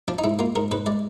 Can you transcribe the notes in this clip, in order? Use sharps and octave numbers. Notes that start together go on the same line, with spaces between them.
F3 D4
D#4
G#2 E4
A#3 F4
G#2 A#4
G#2 B4
G#3 D5